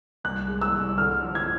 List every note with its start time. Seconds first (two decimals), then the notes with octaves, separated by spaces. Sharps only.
0.24 C2 F#6
0.48 G#3
0.62 E6
0.74 C2
0.98 D3 F6
1.23 F3
1.35 G#6